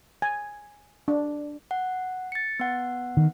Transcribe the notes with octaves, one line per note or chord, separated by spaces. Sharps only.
G#5
D4
F#5
A6 C#7
B3 F#5
D#3